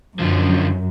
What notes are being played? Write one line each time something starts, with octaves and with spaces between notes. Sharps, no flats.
F#2 D3 F3